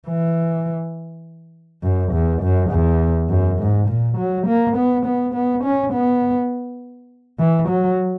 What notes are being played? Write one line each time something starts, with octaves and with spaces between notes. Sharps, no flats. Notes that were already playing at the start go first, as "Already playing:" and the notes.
E3
F#2
E2
F#2
E2
F#2
G#2
A#2
F#3
A#3
B3
B3
B3
C#4
B3
E3
F#3